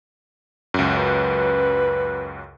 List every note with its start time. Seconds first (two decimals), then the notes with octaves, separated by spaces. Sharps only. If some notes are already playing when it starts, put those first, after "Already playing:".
0.74 C#2 F#2
0.96 B4